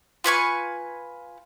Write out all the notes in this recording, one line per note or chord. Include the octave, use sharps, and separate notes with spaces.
F4 B4 G#5 C#6